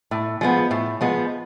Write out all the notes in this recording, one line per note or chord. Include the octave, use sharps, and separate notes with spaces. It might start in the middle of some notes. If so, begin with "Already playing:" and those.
A2
F3 G#3 B3
A2
F3 G#3 B3